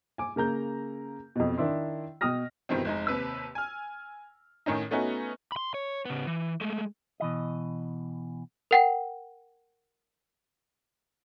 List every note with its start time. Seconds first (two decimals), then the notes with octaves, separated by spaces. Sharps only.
0.18 G#5 D6
0.36 C#3 A#3 A#5 G6
1.36 F2 B2
1.58 D#3 D4 E4 C6
2.21 B2 G5 D#6 F6 A#6
2.69 G2 B2 D#3 E3 C4
2.85 F1 G#3 D#4
3.07 D#2 C3 B4 E6
3.55 G#5 F6
4.66 A2 D#3 C#4 D#4
4.91 A3 B3 C#4 D#4 F#4
5.52 B5 C6
5.74 C#5
6.05 C#3 B3
6.27 E3
6.61 G#3 A3
7.20 B2 E3 D#5
8.71 A#4 F#5 G5